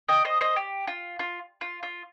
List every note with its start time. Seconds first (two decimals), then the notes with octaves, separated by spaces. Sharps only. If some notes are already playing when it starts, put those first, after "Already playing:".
0.08 D#5 G5
0.25 C5 D#5
0.41 C5 D#5
0.56 G4
0.87 F4
1.19 F4
1.61 F4
1.83 F4